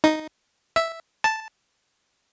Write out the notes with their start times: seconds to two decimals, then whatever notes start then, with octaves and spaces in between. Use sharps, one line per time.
0.04 D#4
0.76 E5
1.24 A5